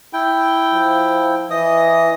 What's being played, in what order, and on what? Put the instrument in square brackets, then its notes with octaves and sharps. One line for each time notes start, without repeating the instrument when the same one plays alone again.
[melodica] E4 G5
[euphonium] F3
[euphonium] E3 [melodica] D#5 D#6